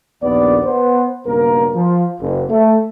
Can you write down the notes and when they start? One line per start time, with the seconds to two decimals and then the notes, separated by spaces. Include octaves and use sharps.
0.23 A#1 D#2 B3 D5
0.65 B3 C5
1.27 B1 G2 C#3 A#3 A#4
1.75 F3
2.20 F#1
2.50 A3